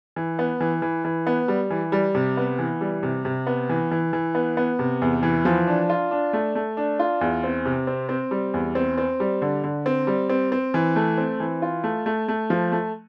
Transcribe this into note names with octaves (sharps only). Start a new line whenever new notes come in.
E3
B3
E3
E3
E3
B3
G3
E3
G3
C3
B3
E3
G3
C3
C3
B3
E3
E3
E3
B3
B3
C3
E2
E3
F3
D4
F4
D4
A3
A3
D4
F4
E2
C4
C3
C4
C4
G3
E2
C4
C4
G3
D3
D3
C4
G3
C4
C4
E3
A3
C4
E3
F4
A3
A3
A3
F3
A3